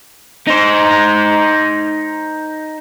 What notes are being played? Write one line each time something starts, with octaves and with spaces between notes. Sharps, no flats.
D#4 C5